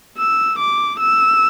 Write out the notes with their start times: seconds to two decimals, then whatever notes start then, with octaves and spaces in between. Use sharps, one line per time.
0.18 E6
0.59 D6
1.00 E6